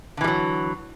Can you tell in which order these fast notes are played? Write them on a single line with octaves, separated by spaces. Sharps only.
D3 E3 G3 F#3